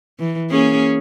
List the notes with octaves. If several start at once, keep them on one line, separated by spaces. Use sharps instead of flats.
E3
A#3 C#4 G#4